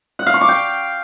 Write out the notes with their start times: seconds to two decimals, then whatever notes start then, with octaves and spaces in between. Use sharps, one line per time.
0.19 F#5
0.26 F5
0.34 C#6
0.41 D6
0.49 G5